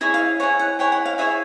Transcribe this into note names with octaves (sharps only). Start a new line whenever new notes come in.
E4 G#4 C#5 D#5
F5
E4 G#4 C#5 F#5
F#5
E4 G#4 C#5 G5
F#5
F5
E4 G#4 C#5 E5